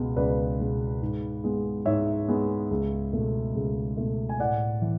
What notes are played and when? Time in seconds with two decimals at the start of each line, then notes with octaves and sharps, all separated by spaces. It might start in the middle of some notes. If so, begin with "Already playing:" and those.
Already playing: C#2 B2 G#3 B3
0.17 C#2 B4 D5
0.60 B2 G#3 B3
1.01 G#2
1.44 G#3 B3
1.86 G#2 C#5 E5
2.28 G#3 B3
2.70 C#2
3.13 B2 A3
3.55 C#2
3.97 B2 A3
4.29 G#5
4.39 A2 D5 F#5
4.82 E3